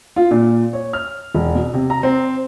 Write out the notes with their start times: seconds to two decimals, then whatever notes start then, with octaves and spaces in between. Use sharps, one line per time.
0.16 F4
0.31 A#2
0.73 C#5
0.93 F6
1.35 E1
1.55 B2
1.74 C3
1.90 A#5
2.03 C4